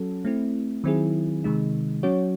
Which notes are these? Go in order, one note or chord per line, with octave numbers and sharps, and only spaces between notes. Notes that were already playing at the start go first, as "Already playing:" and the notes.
Already playing: F#3 C#4 F#4 A4
A3 C4 E4
D#3 F#3 C4 E4 G#4
C3 D#3 G#3 D#4
F#3 C#4 F#4 C#5